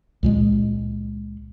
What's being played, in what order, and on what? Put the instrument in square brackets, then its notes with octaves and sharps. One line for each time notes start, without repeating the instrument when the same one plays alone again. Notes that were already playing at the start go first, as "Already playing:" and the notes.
[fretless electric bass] C#2 A#2 G#3